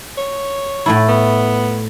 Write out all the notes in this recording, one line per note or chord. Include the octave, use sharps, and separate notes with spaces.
C#5
A2 A3 E4
B3